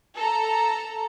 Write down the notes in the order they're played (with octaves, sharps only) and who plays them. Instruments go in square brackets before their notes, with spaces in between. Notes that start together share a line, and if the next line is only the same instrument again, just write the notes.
[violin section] A4 A#5